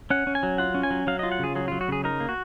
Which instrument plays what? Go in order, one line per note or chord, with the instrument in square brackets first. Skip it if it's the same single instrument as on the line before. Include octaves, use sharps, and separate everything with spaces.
[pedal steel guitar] C#4 F#5
C#4
G#5
F#3
F4 F#5
C#4
G#5
F#3
F#3 F5
F4 D#5
F#5
C#3 G#4
F#3 G#4
F#3 F4
F#4
C#3 G#4
D#4 A#4
A#3
F#4